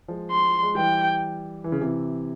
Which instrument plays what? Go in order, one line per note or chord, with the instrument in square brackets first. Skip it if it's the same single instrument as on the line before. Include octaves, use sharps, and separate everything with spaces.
[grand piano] F3 G#3
[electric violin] C6
[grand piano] G#3
[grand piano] E3 G3 [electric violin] G5
[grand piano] E3
C#3
C3 E3